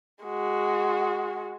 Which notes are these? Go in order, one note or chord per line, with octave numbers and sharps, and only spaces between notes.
G#3 F#4